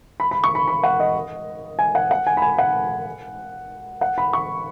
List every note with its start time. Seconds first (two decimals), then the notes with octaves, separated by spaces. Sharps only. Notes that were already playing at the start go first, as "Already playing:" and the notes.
0.20 B5
0.31 B5
0.44 C#6
0.55 B5
0.68 B5
0.83 F#5
1.00 D#5
1.79 G#5
1.95 F#5
2.11 F#5
2.27 G#5
2.37 B5
2.42 G#5
2.58 F#5
4.01 F#5
4.18 B5
4.33 C#6